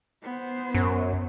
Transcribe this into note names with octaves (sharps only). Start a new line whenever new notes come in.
B3 C5
F#2